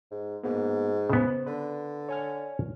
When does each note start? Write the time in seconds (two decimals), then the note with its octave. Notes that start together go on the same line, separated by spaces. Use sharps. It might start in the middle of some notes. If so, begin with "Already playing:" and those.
0.11 G#2
0.43 G#2 A#3 B3 F#4
1.10 C#3 B3 C5
1.47 D3 B4
2.09 C#5 G#5 F6